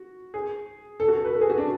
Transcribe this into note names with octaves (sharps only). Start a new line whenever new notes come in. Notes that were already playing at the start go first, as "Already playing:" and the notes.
Already playing: F#4
G#4
A4
F#4
A4
B4
A4
G#4
F#4
D4